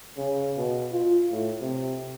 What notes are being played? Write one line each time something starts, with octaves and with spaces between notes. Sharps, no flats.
C#3
B2
F4
A2
C3